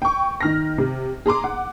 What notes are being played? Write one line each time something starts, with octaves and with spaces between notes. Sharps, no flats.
G5 C#6
D#3 F6 A#6
C3
G#4 A#5 C6 D6
F#5